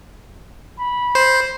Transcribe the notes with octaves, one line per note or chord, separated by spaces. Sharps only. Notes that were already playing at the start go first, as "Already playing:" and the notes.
B5
C5